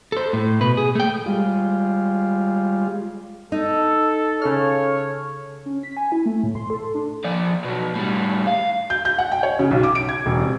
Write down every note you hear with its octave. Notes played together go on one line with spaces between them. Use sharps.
A4 C5
A2
B2 B4
G#4
A3 G5
G3 G#3 F4
D#4 A4
C#3 A4 C#5 F6
C#4
B6
G#5
E4
A3
A2
C6
A4
D4
F3 D5
B2 F#3
A2 G3
F5
G6
G6
F#5
G5
C#5
C#3
B1
D6
D7
G#6
E1
C3